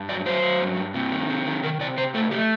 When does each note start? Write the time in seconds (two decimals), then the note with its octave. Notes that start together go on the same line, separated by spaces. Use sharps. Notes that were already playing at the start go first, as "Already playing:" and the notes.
Already playing: G2
0.09 F#3 D5
0.25 F#3 C5
0.42 F#3
0.60 G2
0.77 G2
0.94 C3
1.12 D#3
1.29 C3
1.46 D#3
1.63 D#3 A#4
1.80 C3 D5
1.98 C3 C5
2.14 A3 A4
2.31 A3 G4